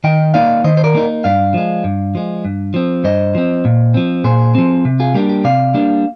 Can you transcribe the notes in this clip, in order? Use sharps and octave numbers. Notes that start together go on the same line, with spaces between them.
D#3 D#5 G5
A#3 D#4 D5 F5
D#3 C5 D#5
C5
A#4 D5
A#3 D#4
G2 D5 F5
F3 G#3
G2
F3 G#3
G2
F3 C4
G2 C5 D#5
F3 C4
A#2
F3 C4
A#2 G#4 C5
F3 C4
C3
F4 G#4
G3 A#3 D4 G4
G4
C3 D5 F5
G3 A#3 D4